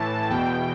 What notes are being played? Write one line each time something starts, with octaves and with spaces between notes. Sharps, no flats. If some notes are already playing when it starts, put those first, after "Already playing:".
Already playing: A2 E3 A5
E2 B2 G5